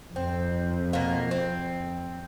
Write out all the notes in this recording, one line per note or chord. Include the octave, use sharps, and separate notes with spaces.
F2 C4
B2 A#3
C4